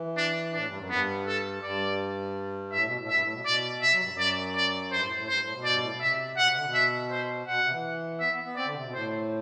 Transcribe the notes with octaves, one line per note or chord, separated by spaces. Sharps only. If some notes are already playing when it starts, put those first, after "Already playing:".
Already playing: E3
D4
A2 D4
G2
F#2
G2 B3
A4
G2 D5
A2 E5
B2
A2
G2 E5
A2
B2
B2 D5
C3 E5
F#3
G2
F#2
D5
D5
G2 C5
A2
A2
G2 C5
A2
B2
G2 D5
A2
B2
C3 E5
B2 F#5
C3
D3
B2
E5
C5
B2 F#5
C3
E3
B3 E5
B3
B3
C4 D5
D3
C3
B2
A2 C5